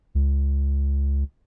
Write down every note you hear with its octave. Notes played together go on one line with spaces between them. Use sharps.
C#2